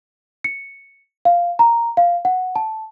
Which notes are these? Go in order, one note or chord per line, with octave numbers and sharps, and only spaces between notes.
C#7
F5
A#5
F5
F#5
A5